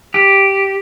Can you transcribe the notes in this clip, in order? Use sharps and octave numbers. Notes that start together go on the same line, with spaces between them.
G4